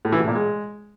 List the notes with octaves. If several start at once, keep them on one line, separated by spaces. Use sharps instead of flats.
A2
E3
A2
A#2
G#3